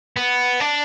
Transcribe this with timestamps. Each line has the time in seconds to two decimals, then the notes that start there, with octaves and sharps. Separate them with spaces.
0.17 B3
0.60 D4